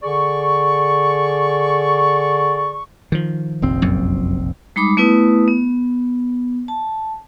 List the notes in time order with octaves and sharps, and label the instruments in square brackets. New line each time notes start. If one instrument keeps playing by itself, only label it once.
[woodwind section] D3 G#4 D5 C#6
[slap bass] D#3 F3
[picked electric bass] F1 A#1 C4
[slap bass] F#2 A#2
[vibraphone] G3 G#3 D#4 B5 D6
A3 B3 E4 B4 D#6
B3
A5